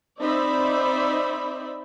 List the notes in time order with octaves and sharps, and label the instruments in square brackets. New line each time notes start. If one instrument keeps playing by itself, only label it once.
[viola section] C4 D#4 C5 D5 E5 B5